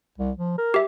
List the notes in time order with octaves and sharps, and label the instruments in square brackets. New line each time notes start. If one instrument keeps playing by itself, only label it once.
[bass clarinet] C2
F3
A#4
[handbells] G4 E5